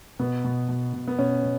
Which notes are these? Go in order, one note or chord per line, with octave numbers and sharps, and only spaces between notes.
B2 B3
B2
B2
B2
B3
B2 C#4
B2